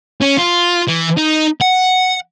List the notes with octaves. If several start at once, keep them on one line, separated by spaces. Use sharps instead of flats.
C#4
F4
E3
D#4
F#5